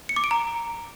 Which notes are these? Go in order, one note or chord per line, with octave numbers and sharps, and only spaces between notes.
C#7
D6
D7
A#5